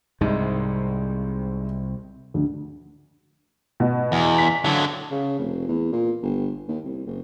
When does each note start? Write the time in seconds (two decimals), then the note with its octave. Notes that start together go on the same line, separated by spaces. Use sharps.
0.21 C2 G#2 C3
2.34 D2
3.80 B2
4.12 E2
4.38 B6
4.64 D3 F#3
5.11 C#3
5.39 F1
5.68 E2
5.92 A#2
6.23 G1
6.68 D#2
6.85 C2
7.06 F#1